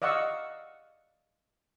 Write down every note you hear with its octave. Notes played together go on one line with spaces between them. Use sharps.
D5 D#5 F5 F#5 C#6 E6